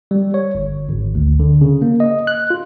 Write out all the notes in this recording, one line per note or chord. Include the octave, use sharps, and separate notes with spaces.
G3
C#5
G1
G#1
D2
D3
C#3
A#3
D#5
F#6
F4